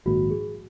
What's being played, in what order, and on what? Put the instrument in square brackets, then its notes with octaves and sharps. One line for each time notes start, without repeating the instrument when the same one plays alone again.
[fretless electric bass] A#1 G#2 D#3 A#3 [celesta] F#4
[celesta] G#4